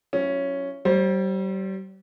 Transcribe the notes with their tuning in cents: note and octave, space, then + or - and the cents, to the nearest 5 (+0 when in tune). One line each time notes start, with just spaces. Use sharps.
F#3 +0 C#4 +0 E4 +35
G3 -35 C5 +20